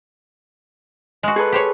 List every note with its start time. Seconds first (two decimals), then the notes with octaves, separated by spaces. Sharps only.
1.23 G#3 F#4
1.36 G#4 A4 B4
1.52 G4 C5 C#5